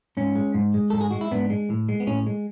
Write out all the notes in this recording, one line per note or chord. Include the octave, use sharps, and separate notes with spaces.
G#2 C#4
G#3
G#2
G#3
G#2 A4
G#4
G#3 F#4
E4
G#2 B3 D4
G#3
A2
G#3
B3
A2 C#4
G#3